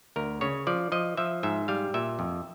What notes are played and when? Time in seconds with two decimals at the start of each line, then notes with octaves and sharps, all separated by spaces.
0.16 D2 A#4
0.41 C#3 C#5
0.67 F3 D5
0.92 F3 D#5
1.17 F3 E5
1.43 G#2 E5
1.68 G3 F5
1.94 A#2 E5
2.19 F2